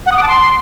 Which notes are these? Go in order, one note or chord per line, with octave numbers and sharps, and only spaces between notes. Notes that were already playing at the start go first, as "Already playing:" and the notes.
F#5
D#6
D6
A5
C6